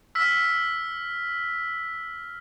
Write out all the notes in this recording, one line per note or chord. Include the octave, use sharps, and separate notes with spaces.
E6 F6 B6